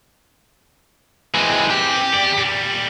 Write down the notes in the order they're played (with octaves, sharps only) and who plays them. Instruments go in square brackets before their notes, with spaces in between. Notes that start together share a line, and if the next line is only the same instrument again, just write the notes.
[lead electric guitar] E3 G#3 [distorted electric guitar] C4 G#4
[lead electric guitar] G4
[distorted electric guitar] E2 D5
A#2 G3